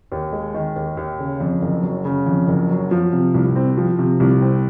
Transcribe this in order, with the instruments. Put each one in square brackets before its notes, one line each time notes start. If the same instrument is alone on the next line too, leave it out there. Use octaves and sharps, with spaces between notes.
[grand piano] D#2
G#3
D#3
D#2
D#2
C#3
F2
F#1
F#3
C#3
F2
F#1
F#3
F3
C3
C2
C4
F3
C3
C2
C4